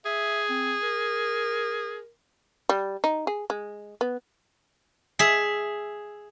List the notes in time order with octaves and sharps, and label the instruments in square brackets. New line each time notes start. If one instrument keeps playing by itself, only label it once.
[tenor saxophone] G#4 [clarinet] E5
[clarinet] C4
A#4
[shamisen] G3
D#4
G#4
G#3
B3
[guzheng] G#4 E5